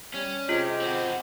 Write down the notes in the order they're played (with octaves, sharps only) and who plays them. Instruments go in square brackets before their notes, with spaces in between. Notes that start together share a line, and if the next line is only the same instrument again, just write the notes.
[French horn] G3 [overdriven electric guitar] C#4
[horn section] C3 G#3 G4 [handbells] F4 C5 [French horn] D#5
[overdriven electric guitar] C4 F#4